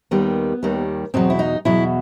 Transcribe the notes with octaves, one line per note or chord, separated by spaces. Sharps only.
D#2 D#3 G3 B3
D#2 D#3 G3
E2 B2 F#3 C4
E4
D#4
E2 B2 F#3 E4